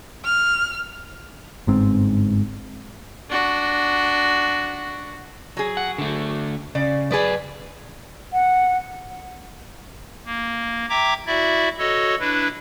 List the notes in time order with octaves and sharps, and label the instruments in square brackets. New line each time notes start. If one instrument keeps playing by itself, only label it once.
[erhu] F6
[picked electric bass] G1 G#2 C4
[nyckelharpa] D4 F#4
[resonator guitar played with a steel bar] F#3 G#4
[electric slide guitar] F#5
D3 A3
[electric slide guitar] C#3 [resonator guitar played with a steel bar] D5
[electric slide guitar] F#2 B4 [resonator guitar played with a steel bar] G#4 D5
[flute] F#5
[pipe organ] A#3
E5 G5 A#5 D6 G#6
E4 F#4 D5 E5
F#4 A4 C#5 D#5
D4 E4 B4